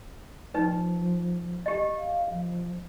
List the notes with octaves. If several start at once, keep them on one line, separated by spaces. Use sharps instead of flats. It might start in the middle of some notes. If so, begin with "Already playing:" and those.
F3 D#4 B4
G4 D#5
F5
F3